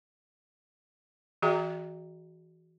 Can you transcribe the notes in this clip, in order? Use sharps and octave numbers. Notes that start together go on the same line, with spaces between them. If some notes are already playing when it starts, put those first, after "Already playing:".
E3 F#4 G#4 E5 G5 A#5